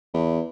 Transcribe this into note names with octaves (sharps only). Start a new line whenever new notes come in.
E2